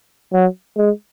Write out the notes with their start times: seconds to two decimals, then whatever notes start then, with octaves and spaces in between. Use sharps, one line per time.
0.33 F#3
0.77 G#3